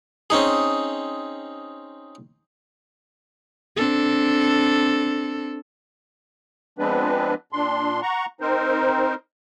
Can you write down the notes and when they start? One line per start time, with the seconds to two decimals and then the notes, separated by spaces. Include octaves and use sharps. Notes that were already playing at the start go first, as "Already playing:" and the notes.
0.30 C4 C#4 D#4 G#4
3.76 C4 D4 A4
6.79 F3 G#3 B3 C4 D4 B4
7.53 A#2 D4 C6
8.02 F#5 A#5 C#6
8.41 C4 D#4 A#4 C5